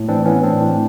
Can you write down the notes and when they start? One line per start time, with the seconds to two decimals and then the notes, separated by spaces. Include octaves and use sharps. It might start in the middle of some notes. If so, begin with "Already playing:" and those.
Already playing: A2
0.08 E3 C4 D4
0.26 E3 B3 C#4
0.43 A2 C4 D4
0.61 A2